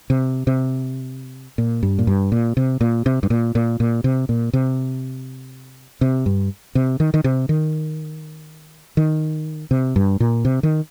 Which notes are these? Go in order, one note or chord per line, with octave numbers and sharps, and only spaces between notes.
C3
C3
A#2
G2
A#2
G2
A#2
C3
A#2
C3
G2
A#2
A#2
A#2
C3
A#2
C3
C3
G2
C3
D#3
D#3
C3
D#3
D#3
C3
G2
A#2
C3
D#3